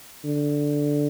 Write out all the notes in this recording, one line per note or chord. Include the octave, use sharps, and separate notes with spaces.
D3